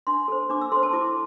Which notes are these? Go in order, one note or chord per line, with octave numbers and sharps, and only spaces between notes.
D4 C6
A4 C5
D4 D6
E6
A4 C5 C6
A5
E4 D6